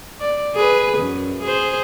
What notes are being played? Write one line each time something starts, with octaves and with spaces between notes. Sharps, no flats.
D5
G#4 B4
F#2
G#4 C5